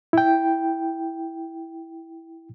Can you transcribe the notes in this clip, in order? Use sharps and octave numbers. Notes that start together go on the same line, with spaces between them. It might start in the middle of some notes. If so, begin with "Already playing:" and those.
E4 G5